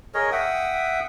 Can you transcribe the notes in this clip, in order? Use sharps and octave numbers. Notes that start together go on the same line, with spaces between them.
G#4 A#4 C#5 D#5
E5 F#5 G5 D#6